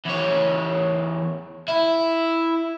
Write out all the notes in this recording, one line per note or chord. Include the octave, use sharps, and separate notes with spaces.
E2 C#5
E4